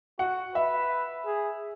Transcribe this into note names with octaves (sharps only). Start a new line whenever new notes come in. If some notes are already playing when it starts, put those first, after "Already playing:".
F#4 F#5
B4 E5
G#4